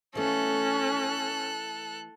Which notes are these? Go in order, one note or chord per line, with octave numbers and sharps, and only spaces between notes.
E3 A3 C#4 A4 F#6